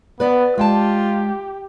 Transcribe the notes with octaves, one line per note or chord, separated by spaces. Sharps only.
B3 B4 D5
G#3 F4 G4 G5 A5